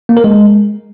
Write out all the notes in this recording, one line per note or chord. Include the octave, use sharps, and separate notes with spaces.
A#3
A#4
G#3